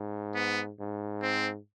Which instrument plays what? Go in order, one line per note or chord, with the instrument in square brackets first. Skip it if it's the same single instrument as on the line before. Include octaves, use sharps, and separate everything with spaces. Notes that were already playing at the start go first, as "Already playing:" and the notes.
Already playing: [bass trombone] G#2
[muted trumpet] B3
[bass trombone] G#2
[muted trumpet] C4